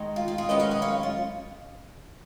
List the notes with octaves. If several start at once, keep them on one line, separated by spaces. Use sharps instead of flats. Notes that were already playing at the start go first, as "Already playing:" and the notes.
Already playing: D#3 G#3 D#4
F4
F4
F4 G#4
F#2 D#3 G#3 C#4 B4 D#5
C#5 F5
B4 D#5
C#5 F5
F4